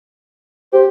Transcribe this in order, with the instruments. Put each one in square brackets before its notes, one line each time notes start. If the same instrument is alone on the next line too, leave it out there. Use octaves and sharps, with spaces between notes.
[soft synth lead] G4 [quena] C5